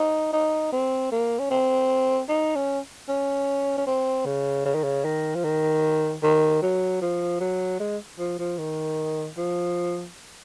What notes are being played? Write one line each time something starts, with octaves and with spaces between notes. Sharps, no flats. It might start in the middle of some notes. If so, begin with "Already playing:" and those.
Already playing: D#4
D#4
C4
A#3
C#4
C4
D#4
C#4
C#4
C#4
C4
C#3
C#3
D#3
C#3
D#3
F3
D#3
D#3
F#3
F3
F#3
G#3
F3
F3
D#3
F3